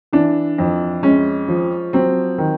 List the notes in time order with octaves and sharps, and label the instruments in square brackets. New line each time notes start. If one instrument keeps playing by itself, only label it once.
[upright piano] E3 D4
F2
G#3 C#4
F3
F#3 C4
D#3